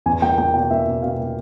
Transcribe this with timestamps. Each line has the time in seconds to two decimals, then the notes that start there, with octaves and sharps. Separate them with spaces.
0.06 E2 G#5
0.22 A#3 G5
0.38 A#3 G5
0.54 B2 G5
0.71 A#3 E5
0.87 B2
1.02 B2 F5
1.19 A#3